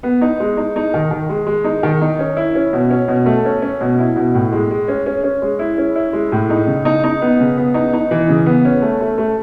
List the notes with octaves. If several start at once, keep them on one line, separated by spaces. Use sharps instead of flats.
B3
D#4
G#3
D#4
D#4
D#3
D#3
G#3
G#3
D#4
D#3
D#4
C#4
E4
C#4
B2
C#4
B2
A3
C#4
C#4
B2
E4
B2
A2
G#3
G#3
C#4
C#4
C#4
G#3
E4
C#4
E4
G#3
A2
D#4
C#3
D#4
D#4
B3
C#3
B3
D#4
D#4
E3
C#3
B3
C#4
A3
A3
A3